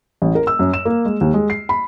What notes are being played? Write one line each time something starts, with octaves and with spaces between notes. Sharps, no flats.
A1
A#4
E6
F#2
E7
A#3
G#3
D#2
G#3
C7
B5